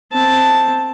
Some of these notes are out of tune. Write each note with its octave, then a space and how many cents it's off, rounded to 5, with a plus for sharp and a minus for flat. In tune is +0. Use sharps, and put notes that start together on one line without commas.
C4 +0 A5 +0